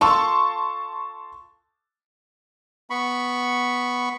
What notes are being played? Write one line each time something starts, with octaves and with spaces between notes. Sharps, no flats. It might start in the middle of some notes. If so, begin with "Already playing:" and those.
F4 A4 A5 C6 C#6
B3 B5 C#6